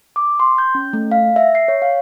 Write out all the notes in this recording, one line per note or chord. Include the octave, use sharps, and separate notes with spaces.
D6
C6
G6
C#4
A3
F5
E5
C7
C#5
F5